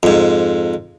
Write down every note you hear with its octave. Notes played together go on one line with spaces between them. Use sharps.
F2 G#2